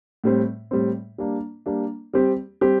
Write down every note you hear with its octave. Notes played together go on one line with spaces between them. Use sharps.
A2 G3 C4
A2 G3 C4
G3 A#3 D4
G3 A#3 D4
G3 C4 G4
G3 C4 G4